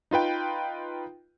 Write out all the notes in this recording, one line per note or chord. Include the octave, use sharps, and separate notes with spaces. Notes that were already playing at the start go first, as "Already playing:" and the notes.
D#4 F4 B4 G5